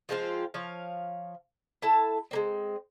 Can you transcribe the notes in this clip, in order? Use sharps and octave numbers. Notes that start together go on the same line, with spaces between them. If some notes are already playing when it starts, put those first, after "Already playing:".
F3 G#3 C4 F4
F3 C#5 F5
E4 A4 A5
G#3 A#3 C4